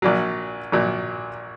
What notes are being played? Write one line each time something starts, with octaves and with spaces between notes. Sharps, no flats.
A#1 A#2 F#3
A#1 A#2 F#3